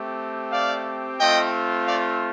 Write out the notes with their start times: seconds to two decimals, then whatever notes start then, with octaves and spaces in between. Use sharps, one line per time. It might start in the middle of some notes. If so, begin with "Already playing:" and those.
Already playing: A3 C4 G4
0.52 D5 F5
1.19 A3 C4 F4 D#5 G5
1.87 D5 F5